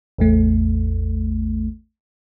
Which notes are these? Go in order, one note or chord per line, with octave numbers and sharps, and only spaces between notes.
A1 E2 A3